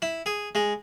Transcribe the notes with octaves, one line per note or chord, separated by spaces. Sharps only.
E4
G#4
G#3